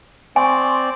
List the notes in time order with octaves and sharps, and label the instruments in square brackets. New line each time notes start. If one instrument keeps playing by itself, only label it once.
[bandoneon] C4 D5 [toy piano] G#5 [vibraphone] C6 C#6